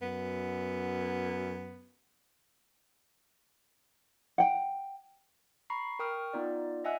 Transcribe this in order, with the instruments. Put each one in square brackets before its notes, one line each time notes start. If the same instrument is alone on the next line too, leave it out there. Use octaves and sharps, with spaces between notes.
[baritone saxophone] F#2 [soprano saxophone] B3
[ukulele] F#5 G5
[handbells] A#5 B5 C#6 C7
A#4 G5 C#6 D#6 F6
B3 D#4 F4 D5
D#5 E5 F#5 G#5 E6 F#6